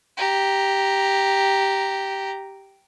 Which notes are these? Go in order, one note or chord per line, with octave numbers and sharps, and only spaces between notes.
G4 A#5